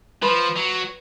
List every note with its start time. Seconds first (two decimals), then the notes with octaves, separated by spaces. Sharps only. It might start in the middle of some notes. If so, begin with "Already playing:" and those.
0.22 F3 B4
0.57 F#3